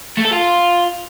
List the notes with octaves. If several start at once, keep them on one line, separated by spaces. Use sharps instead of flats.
A3
A4
F4